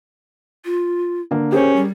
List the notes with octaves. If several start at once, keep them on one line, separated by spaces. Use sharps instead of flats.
F4
D3 A#3
C#4 G4 G#4 A#4 C5
G3